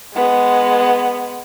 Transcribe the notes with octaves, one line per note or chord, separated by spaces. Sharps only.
G#3 B3